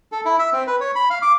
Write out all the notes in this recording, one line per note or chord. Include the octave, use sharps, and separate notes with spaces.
A4
E4
E5
C4
B4
C#5
B5
F5
D6